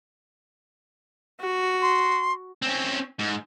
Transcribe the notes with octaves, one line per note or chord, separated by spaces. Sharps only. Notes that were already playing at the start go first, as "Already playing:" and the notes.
F#4
C6
C4 C#4
G#2